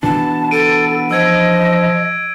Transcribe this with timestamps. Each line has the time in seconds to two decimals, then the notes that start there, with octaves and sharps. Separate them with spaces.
0.03 B2 E3 B3 D4 A5
0.51 A4 D7 D#7
1.11 F3 D#5 E6 G#6 D7